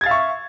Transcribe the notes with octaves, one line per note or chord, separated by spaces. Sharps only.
E5 F5 C#6 G#6 A6